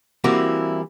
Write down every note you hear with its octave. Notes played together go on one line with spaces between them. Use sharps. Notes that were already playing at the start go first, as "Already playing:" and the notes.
E3 G3 A#3 C4 E4 F#4